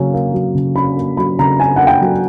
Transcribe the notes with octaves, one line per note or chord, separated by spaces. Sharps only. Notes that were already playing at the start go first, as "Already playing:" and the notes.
Already playing: C#3 F#3 A#3 C#4
A#3
F#3
C#3
C#4 B5
A#3
F#3 B5
C#3 A#5
C#4 G#5
A#3 F#5
G5
F#3